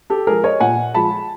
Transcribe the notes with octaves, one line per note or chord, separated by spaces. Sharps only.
G4 A4
F3 G#3 G#4 A#4
C#5 D#5
A#2 F#5 G#5
F3 G#3 A5 B5